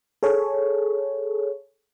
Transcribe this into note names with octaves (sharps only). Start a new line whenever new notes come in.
G#4 A4 C#5